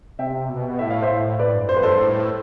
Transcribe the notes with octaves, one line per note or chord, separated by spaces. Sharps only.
C3 E5 G5
B2
A2 E5
F5
C5 E5
A2
A2 B4 D5
G2
F2 C5
B4
G2 A4 C5
A2